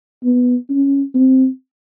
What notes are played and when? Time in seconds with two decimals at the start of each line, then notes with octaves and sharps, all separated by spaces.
0.24 B3
0.69 C#4
1.14 C4